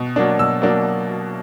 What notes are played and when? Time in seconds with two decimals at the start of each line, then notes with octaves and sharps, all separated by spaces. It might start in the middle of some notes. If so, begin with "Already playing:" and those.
Already playing: B2
0.16 F#3 A#3 D4
0.39 B2 E6
0.62 F#3 A#3 D4